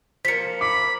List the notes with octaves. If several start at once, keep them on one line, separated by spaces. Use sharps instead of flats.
F3 A#3 B6 C#7
B5 D6